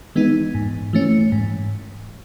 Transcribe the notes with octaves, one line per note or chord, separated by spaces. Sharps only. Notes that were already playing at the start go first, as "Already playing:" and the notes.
E3 G#3 B3 D#4
G#2
E3 A3 C#4
G#2